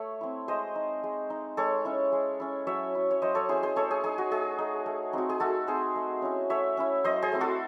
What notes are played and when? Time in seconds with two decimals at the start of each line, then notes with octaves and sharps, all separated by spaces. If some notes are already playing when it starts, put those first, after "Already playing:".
Already playing: A3 C#5
0.21 C4 E4
0.48 G#3 C5 D#5
0.75 D#4
1.04 G#3
1.30 D#4
1.57 G#3 A4 C#5
1.85 C#4 E4
2.12 G#3
2.40 C#4 E4
2.67 F#3 C#5 E5
2.95 C#4 E4
3.11 C#5
3.22 F#3 C5 D#5
3.35 A4 C#5
3.49 C#4 E4 G#4 C5
3.63 G#4 C5
3.76 A3 A4 C#5
3.91 G#4
4.04 D#4 G#4
4.18 F#4
4.31 A3 G#4
4.58 D#4
4.86 A3
5.13 C4 D#4 F#4
5.29 G#4
5.40 A3 F#4 A4
5.67 C4 D#4 G#4 C5
5.96 A3
6.22 C#4 E4
6.50 A3 C#5 E5
6.77 C#4 E4
7.04 F#3 C5 D#5
7.22 G#4 C5
7.32 A3 C4 E4
7.41 F#4 A4